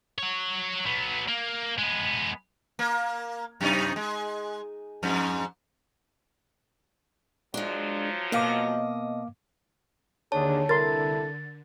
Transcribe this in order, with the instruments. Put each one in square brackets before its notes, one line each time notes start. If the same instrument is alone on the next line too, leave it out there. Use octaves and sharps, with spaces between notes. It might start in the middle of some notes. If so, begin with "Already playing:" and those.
[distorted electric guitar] F#4 C#5
F#3 B3
A#3
G#3 B3
[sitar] A#3
F#2 C3 D#4
G#3
F2 G#2
[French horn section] F3 F#3 [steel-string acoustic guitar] G#3 D4
[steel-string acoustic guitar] B2 D#5 [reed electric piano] A#3 F5 D6
[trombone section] D#2 D4 G#4 [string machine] D3 [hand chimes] C#5 A5
[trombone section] C2 E4 A4 [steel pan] A#4 C6 [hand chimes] A6